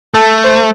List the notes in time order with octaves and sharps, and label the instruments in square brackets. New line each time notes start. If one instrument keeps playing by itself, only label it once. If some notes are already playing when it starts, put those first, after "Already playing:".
[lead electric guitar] A3 [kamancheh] A4
[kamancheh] C5